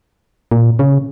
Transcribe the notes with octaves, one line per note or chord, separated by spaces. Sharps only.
A#2
C#3